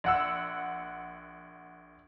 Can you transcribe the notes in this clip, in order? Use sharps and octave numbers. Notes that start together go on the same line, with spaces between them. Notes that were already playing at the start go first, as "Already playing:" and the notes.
A#1 F#5 E6